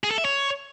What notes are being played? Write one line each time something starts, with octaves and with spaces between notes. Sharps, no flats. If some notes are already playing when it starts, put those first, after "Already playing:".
G#4
A4
E5
C#5